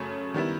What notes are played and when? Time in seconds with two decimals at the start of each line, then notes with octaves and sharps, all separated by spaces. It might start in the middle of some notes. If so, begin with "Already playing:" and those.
Already playing: F#2 C#3 F#3 A3
0.34 D#3 G3 B3 E4